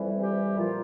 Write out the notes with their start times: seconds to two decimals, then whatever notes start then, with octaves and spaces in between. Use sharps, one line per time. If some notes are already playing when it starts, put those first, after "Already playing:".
Already playing: F2 E3 G3
0.20 G4
0.57 A#2 F3 F4